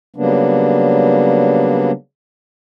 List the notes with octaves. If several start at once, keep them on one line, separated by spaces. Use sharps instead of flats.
C#3 F#3 G3 A#3 B3 D4